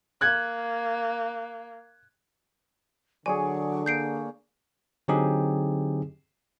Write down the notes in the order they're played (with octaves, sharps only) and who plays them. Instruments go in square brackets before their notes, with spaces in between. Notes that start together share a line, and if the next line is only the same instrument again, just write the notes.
[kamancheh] A#3 [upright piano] F#6 G#6
[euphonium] D3 [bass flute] F#3 [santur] G#4 C#5 D5 [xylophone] G#5
[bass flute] A#3 [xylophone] G6 C7 D7
[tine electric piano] D3 F#3 C4 D#4 G4 G#4